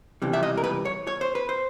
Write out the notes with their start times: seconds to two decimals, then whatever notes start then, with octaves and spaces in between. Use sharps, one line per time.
0.22 C#2 C3 E3 G3
0.33 E5
0.43 D#5
0.57 A#4
0.64 B4
0.85 C#5
1.07 C#5
1.21 C5
1.35 B4
1.49 C5